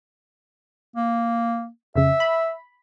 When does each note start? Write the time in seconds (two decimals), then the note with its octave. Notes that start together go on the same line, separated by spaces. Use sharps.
0.96 A#3
1.96 F2 C#3 E5
2.20 B5